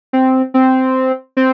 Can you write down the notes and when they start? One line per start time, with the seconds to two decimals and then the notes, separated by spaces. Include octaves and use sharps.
0.13 C4
0.54 C4
1.37 C4